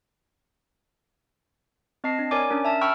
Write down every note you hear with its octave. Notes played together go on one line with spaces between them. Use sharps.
C4 D#5 A5 C7
D4
A#4 C#5 D5 G#5 D6
C#4 D4 A#4
E5 A5
G5 B5 C#6 E6 F6